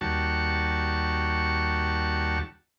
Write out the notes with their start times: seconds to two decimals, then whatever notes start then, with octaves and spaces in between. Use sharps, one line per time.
0.01 D#2 G3 F#4 A5 C#6